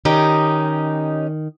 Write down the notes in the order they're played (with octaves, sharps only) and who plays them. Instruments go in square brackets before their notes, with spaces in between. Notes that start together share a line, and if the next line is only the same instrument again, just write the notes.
[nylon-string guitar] D#3 [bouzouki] C#4 D#4 G4